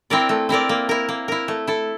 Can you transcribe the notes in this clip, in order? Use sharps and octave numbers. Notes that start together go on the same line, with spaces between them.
C4 E4 A#4 D5
A3
C4 E4 A#4 D5
A#3
E4 A#4
A#3
E4 A#4
A3
E4 A4